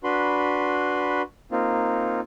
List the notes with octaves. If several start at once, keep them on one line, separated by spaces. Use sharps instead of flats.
D4 F#4 B4 B5 C6
A#3 C4 D#4 F4